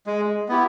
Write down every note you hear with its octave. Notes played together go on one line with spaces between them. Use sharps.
G#3
B3 E4 G4